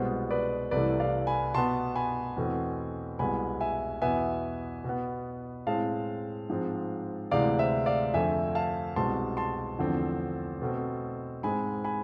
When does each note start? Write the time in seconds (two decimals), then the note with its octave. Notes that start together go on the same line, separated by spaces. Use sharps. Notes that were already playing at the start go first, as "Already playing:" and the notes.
Already playing: C2 B2 G#3 B3 C5
0.30 B4 D5
0.71 C2 C3 E3 A3 B4 D5
1.00 D5 F5
1.27 G#5 B5
1.54 B2 B3 A5 C6
1.96 G#5 B5
2.36 E2 B2 A3 C4
3.19 C2 B2 G#3 B3 G#5 B5
3.61 E5 G#5
4.02 E2 B2 B3 E5 G#5
4.84 B2 B3
5.67 A2 G#3 C4 F5 A5
6.49 G#2 F3 G#3 C4
7.31 D2 C3 E3 G#3 D5 F5
7.59 C5 E5
7.86 D5 F5
8.14 F2 D3 A3 C4 E5 G#5
8.55 F5 A5
8.96 C2 B2 G#3 C4 A5 C6
9.37 A5 C6
9.79 E2 D3 F3 A3 C4
10.62 B2 A3 C4
11.43 G#2 G#3 C4 G#5 B5
11.84 G#5 B5